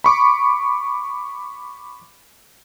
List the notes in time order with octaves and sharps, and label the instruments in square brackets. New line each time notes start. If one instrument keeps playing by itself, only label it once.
[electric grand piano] B5 C#6 D6